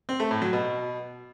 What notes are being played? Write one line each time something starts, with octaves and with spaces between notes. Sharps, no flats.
C4
A3
A2
F#3
B2